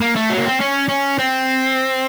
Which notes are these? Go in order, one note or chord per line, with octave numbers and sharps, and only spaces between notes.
A#3
A3
F#3
A#3
C4
C#4
C#4
C4